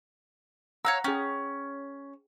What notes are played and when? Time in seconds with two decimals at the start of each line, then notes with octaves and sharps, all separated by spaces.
0.85 C#5 F5 F#5 A#5 E6
1.04 C#4 G#4 G5